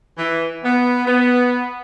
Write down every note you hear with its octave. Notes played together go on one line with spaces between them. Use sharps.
E3
B3
B3